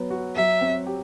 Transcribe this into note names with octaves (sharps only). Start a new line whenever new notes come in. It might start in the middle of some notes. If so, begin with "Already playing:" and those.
Already playing: F#3 B3
F#4
F#3 E5
C4
G4